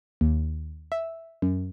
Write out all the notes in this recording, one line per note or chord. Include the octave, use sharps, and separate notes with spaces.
D#2
E5
F#2